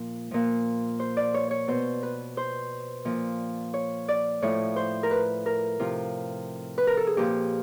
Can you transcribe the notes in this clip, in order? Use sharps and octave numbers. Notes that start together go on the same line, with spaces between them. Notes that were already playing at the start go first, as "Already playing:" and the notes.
Already playing: A#2 F3
A#2 F3
C5
D5
C#5
C#5
B2 C5
B4
C5
A#2 F3
C#5
D5
A2 F3 C#5
C5
A#4
B4
A#4
C3 F3 F4
B4
A#4
A4
G#4
A#2 F3 G4